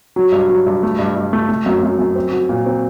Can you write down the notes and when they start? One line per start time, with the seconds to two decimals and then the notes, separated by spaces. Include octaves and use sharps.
0.16 F#3
0.32 G2
0.49 F#3
0.66 G2
0.83 A3
0.99 G2
1.16 G2
1.33 A3
1.49 A3
1.66 F#2
1.83 F#2
1.99 F#2
2.16 C4
2.33 F#4
2.49 A#2
2.66 C4